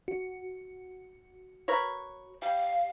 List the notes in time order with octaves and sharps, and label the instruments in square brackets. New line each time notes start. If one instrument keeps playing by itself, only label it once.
[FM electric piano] F#4
[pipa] A#4 B4 C#5
[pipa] G3 [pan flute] F5